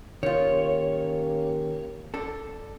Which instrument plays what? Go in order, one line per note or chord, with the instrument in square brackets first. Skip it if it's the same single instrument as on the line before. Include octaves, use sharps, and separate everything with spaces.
[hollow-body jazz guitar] D#3 F4 [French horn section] A#3 C#4 G4 [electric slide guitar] C#5
[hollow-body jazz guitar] D4 A4